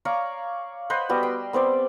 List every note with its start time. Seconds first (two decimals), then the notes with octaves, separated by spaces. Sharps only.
0.05 C#5 D5 F5 A#5
0.90 B4 C5 D#5 F#5
1.09 G3 B3 F#4
1.23 G5 C6
1.53 B3 C4 C5 D5